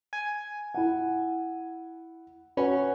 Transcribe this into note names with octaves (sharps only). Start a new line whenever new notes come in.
G#5
E4 F#5
C#4 F#4 B4